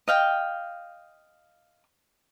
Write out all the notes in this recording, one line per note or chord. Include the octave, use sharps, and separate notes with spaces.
D#5 F5 G5